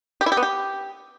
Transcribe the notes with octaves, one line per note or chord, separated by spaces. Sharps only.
G4
E4
G4
B3
G4